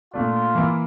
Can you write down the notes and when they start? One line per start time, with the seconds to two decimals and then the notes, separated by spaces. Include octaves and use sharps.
0.14 A#2 A3 D4 F4
0.55 E3 A#3 E4